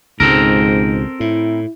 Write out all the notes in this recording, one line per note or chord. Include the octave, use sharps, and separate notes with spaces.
C#2 G#2 B2 C4 A4 A#4
A2 E4